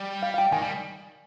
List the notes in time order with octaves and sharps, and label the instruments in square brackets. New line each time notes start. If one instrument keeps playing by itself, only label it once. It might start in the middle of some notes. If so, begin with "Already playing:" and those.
Already playing: [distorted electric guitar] G3
[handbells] F5
F5
G5
[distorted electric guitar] D#3 [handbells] G#5
[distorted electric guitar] G3